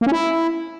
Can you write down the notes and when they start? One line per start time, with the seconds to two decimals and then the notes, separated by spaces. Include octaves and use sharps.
0.01 A#3
0.07 C#4
0.12 E4